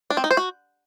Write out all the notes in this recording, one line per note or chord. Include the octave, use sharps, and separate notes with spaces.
D4
C4
D#4
C5
F#4